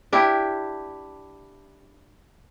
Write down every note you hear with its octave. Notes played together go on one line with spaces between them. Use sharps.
D4 E4 G4